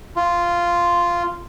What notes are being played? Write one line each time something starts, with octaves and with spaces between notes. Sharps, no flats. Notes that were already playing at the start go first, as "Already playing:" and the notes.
F4